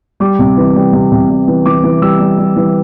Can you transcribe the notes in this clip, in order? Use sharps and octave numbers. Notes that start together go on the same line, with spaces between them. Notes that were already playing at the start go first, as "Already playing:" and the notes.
G3 D6
C3
E3
G3
C3
C3
G3
E3
E3 D6
E3
G3 E6
G3
G3
E3